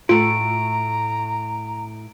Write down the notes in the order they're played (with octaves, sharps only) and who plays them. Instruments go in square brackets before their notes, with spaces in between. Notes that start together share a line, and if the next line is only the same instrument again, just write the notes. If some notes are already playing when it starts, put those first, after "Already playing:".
[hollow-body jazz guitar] A2 A3 [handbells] F4 [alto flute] A#5 [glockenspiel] D7